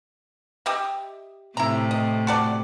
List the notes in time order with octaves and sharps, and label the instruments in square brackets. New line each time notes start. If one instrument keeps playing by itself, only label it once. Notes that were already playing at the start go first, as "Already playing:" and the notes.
[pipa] G4 D#5 E5
[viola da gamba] A2 C3 [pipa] E4 A#5
[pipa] D#5
F#4 A4 D5